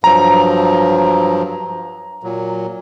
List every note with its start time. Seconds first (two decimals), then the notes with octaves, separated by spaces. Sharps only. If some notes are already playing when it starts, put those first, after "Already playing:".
0.04 G2 F3 F#3 A#5
2.23 A#2 F#3